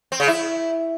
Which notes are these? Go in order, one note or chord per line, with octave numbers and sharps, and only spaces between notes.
C4
C#3
E4